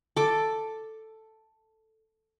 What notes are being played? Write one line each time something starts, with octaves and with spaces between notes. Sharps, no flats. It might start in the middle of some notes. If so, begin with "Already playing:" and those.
A4 D6